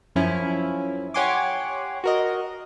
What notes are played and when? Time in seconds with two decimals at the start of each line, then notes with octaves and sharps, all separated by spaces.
0.16 F#2 F3 C#4 E4
1.14 G4 C#5 F#5 G#5 C6 D6
2.04 F#4 A#4 D#5